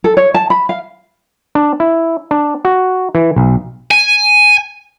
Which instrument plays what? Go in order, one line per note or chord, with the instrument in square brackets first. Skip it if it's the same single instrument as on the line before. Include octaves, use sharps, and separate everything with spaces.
[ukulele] A4
C#5
A5
B5
F5
[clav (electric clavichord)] D4
E4
D4
F#4
E3
B1
[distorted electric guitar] G#5